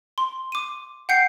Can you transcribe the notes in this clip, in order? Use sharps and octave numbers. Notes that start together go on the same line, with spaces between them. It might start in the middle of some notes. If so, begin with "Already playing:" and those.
C6
D6 D#7
F#5 G5 G6 C7 C#7